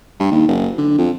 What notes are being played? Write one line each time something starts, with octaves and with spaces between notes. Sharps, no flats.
G2
D#2
F#1
D3
F2